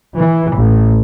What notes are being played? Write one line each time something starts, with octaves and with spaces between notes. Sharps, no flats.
E3
A1